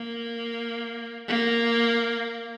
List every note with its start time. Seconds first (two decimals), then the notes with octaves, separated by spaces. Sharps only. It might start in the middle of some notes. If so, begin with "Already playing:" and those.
Already playing: A#3
1.28 A#3